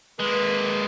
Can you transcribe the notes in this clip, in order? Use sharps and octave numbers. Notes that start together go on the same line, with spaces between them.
G#3 A#3 B4